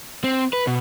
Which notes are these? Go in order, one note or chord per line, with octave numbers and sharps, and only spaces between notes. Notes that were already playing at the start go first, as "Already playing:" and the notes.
C4
B4
B2